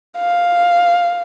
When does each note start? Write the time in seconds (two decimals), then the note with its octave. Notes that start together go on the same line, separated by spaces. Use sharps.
0.18 F5